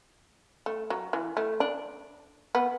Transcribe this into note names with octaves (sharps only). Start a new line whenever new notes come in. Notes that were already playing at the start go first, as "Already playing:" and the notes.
A3
F#3
E3
A3
D4
B3